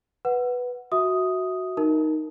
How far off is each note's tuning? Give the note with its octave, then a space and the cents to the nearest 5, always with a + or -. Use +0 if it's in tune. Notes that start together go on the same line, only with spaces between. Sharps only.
B4 +0 F#5 +0
F#4 +0 E5 -20 D#6 +0
D#4 +0 A#4 +0